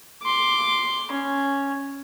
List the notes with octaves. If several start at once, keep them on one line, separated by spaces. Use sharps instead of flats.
C6 D6
C#4